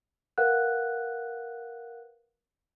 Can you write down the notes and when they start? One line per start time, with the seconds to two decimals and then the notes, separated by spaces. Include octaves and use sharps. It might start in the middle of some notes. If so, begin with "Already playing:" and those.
0.38 A#4 B4 F5 F#5 F#6